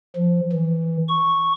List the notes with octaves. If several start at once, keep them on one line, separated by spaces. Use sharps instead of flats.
F3
E3
C#6